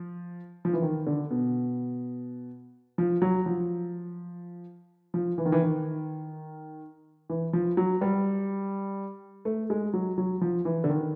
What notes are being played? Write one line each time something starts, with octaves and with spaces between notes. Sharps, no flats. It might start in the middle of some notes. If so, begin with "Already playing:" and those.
Already playing: F3
F3
E3
D#3
D3
B2
F3
F#3
F3
F3
E3
D#3
E3
D#3
E3
F3
F#3
G3
A3
G#3
F#3
F#3
F3
E3
D3
D#3